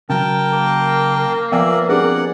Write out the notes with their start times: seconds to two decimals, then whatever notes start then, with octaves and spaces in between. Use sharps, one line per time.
0.10 C#3 F#3 A#4 G5 A5
0.52 A#3
1.52 F3 B3 D5 E5 F5 G5 G#5
1.89 C4 D4 G4 G#4 A#4 D5 F#5